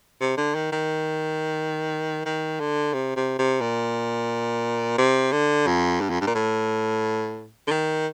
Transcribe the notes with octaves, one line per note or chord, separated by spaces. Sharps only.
C3
D3
D#3
D#3
D#3
D3
C3
C3
C3
A#2
C3
D3
F2
G2
F2
G2
A#2
A2
D3
D#3